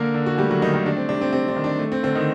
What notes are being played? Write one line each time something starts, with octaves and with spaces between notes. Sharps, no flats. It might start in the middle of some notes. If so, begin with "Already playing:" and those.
Already playing: D3 A#3 A#4
D3
F#4
G3 A3 G4
F#3 F#4
D#3 A3 D#4
D#3 D#4
G3 D4
C4
C3 D4
C4
C3 C4
D4
D#3
D4
A3
C4
D3 C4
D#3 D#4